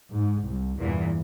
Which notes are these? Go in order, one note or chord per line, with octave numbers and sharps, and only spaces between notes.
G#2
C2
E2 G2 A#2 E3